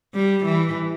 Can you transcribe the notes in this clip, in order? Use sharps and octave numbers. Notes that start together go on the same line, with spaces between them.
G3
E3